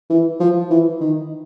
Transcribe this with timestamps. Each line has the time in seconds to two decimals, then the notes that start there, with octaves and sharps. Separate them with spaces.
0.10 E3
0.40 F3
0.70 E3
1.01 D#3